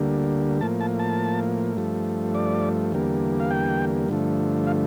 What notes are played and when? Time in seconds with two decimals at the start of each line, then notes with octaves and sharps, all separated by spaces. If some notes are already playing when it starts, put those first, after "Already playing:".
Already playing: D2 D3 G3 A#3
0.61 A2 F3 A#3 A5
0.81 A5
0.99 A5
1.77 G2 F3 A3
2.35 D5
2.92 E2 D3 G3 A#3
3.40 F5
3.51 G5
4.08 G2 D3 F3 A3
4.67 F5